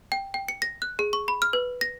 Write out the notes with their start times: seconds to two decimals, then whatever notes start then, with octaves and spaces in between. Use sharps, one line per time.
0.12 G5
0.34 G5
0.48 C#7
0.62 A#6
0.82 F#6
0.99 G#4
1.13 C#6
1.28 B5
1.42 F6
1.53 B4
1.81 A#6